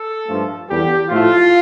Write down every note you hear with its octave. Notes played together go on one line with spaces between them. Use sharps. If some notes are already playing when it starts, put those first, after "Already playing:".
Already playing: A4
G2 F3 A3
E2 D3 G3 G4
A2 F3 A3 F4